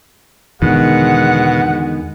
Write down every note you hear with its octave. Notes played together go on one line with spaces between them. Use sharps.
E2 B2 D3 D#3 G#3 F#5